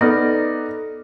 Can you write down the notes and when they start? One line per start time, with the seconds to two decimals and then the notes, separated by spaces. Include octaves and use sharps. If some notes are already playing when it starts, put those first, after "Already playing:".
0.01 B3 D#4 A4 D5 F6 A#6